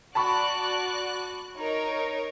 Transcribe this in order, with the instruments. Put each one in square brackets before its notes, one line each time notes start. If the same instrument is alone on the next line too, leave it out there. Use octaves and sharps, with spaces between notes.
[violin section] F#4 D5 F#6 [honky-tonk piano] A5 B5 C#6
[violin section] D#4 A#4 C#5